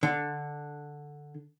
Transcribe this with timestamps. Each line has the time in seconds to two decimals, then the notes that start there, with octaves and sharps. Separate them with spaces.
0.03 D3